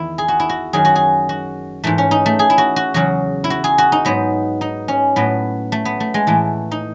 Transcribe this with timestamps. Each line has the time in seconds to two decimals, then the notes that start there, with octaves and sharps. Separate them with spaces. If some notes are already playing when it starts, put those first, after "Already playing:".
Already playing: E2 D#3 E4
0.18 G#4
0.28 F#4
0.40 E4
0.49 F#4
0.73 F#2 D#3 F#3 G#4
0.85 F#4
0.95 G#4
1.29 F#4
1.84 G#2 E3 A3
1.98 C#4
2.11 D#4
2.26 A3
2.39 G#4
2.50 E4
2.58 F#4
2.76 F#4
2.94 E2 C#3 F#3 F#4
3.44 E4
3.50 F#4
3.64 G#4
3.78 F#4
3.92 D#4
4.05 G#2 F#3 B3
4.61 D#4
4.88 C#4
5.16 A2 F#3 B3
5.72 A3
5.85 B3
6.00 A3
6.14 G#3
6.27 A2 E3 A3
6.71 D#4